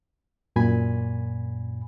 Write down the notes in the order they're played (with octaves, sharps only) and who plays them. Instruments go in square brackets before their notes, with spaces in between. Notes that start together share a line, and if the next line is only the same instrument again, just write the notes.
[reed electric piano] F#2 A#2 G#5 B5